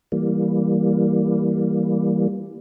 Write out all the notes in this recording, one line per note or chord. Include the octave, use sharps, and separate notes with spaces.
E3 G3 A#3